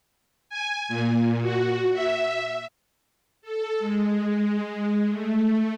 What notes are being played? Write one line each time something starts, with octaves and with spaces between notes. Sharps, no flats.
G#5
A#2
F#4
E5
A4
G#3
A3